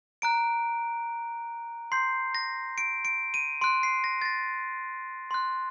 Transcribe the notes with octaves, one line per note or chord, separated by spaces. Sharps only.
A#5 F#6 D7
C6 G6 C7
A#6
D7
D7
D#7
C6 F#6 D7
C7
A#6
A6
A#6
C6 F#6